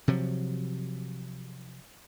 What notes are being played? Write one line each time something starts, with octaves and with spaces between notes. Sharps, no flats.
C3 F3 F#3